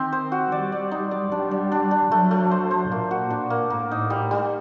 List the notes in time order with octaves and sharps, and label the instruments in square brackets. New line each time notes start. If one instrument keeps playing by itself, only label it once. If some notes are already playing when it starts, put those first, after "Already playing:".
Already playing: [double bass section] D#3 [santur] C4 D#4 G4
[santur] C5
F#4
[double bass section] G3 [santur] D5
[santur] D5
D#4
D5
[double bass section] G3 [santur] D4
[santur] D4
D4
D4
[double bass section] F#3 [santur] A3
[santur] A3
C5
C5
[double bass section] A#2 [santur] A#3
[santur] F#4
D4
A#3
[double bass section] A2 [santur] A#3
[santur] D#4
G3
G3